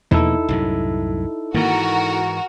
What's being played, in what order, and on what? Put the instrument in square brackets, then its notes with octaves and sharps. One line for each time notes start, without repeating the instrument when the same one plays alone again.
[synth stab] E2 [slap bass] B2 F3 A#3 [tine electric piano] D#4 E4 A4
[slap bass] C2 F#2 A2
[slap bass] G#2 E3 [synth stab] D#3 A#3 [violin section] F#4 A#4